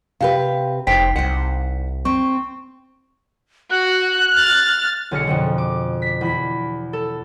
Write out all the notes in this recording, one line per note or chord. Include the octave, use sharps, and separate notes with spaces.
C3 G4 B4 F5
F1 D#4 C5 G5 B6
C2 C5 F#5
C4 C#6
F#4 F#6
F6 A6
B1 D3 G#4 F6 A#6 C#7
F2 B2 D3
D6
B6
E2 B5 B6
A4